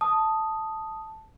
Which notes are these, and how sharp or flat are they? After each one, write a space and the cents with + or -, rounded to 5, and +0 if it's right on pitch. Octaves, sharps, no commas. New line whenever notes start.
A5 +0 D#6 +0